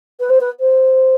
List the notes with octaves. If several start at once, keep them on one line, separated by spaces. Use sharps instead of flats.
B4
C5
B4
C5